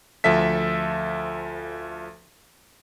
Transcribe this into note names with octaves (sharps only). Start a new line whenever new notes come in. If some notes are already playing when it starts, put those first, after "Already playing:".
D2 F3 A4 E5 B6